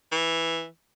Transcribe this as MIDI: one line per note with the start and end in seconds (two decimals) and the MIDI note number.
0.12 0.66 52